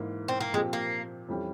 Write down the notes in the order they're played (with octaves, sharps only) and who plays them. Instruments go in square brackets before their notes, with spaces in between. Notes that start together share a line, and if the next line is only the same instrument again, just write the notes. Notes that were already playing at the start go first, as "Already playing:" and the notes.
Already playing: [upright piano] G#2 E3 A#3
[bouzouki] C4
A#3
[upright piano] A#2 F3 C4 G4 [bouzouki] G#3
[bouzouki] A#3
[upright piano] F2 E3 G3 C#4 G4